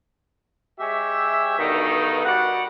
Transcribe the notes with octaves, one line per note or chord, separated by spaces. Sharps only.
G#3 G4 C#5 E5
G2 B2 D3 D#3 D#4 F#4
G3 F#4 D5 F#5